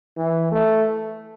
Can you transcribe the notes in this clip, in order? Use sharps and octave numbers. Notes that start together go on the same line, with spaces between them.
E3
A3